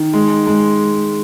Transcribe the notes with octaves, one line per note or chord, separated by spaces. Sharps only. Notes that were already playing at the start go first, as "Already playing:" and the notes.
Already playing: D#3
G#3
G#3